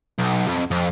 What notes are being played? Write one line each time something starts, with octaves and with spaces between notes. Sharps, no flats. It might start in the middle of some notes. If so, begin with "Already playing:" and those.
B1
F2
F2